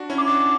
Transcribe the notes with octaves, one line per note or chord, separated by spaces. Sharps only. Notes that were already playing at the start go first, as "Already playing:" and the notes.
Already playing: D4 F#4
C#4 E4
D6
D4 F#4